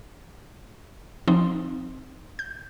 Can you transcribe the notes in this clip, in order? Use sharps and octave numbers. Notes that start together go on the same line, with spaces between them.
F3 C4 D#4
G6